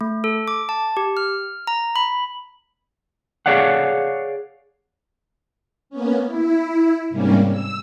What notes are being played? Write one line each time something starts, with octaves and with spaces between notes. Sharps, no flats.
A3
A4
D6
A5
G4
F6
A#5
B5
G#4 C#5 D5 F5 F#5
A#3 B3 C#4
E4
G#2 C3 G3 A#3 C#4
E6